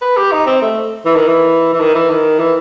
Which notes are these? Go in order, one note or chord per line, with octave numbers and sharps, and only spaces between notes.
B4
G4
D#4
C4
A3
E3
D#3
E3
E3
D#3
E3
D#3
E3